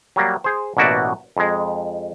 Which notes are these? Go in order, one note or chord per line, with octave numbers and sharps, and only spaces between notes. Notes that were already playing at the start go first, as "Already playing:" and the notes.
F#3 G3 A#3
G#4 C5
A1 B2 A#3 F#4 D5 E5
F2 G#3